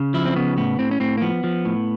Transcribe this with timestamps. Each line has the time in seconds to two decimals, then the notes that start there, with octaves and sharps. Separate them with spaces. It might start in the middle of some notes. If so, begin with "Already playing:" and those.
Already playing: C#3
0.14 F3 E4
0.26 C4
0.36 C#3 B3
0.58 A2 B3
0.79 A2 C4
0.91 C#4
1.00 A2 C4
1.17 A#3
1.21 F3 B3
1.44 F3
1.65 A2